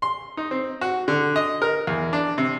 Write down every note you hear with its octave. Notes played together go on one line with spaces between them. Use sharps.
C6
D#4
C4
F#4
D3
D#5
A#4
E2
D4
C3